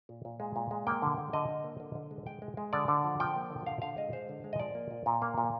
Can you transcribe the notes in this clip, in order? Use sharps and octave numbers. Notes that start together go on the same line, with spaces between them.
A#2
A#2
G#3
A#2
G#3
A#3 G5
D3
D3
D3 D#5
D3
A#3
D3
D3
G#3
G#3 G5
G#3
G#3
D3 D5
D3
F3
F3 G5
A#3
D3
D3 F5
D3 F5
G#3 D#5
G#3 C5
D3
G#3
D#5
F3 D5
A#3
A#2
A#2
A#3
A#2